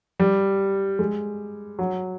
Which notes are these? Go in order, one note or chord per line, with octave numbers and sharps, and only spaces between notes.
G3
G#3
F#3